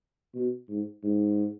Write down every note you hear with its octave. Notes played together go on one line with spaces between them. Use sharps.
B2
G#2
G#2